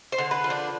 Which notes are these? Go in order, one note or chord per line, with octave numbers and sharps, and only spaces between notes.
C5
D3
B4
F3
D4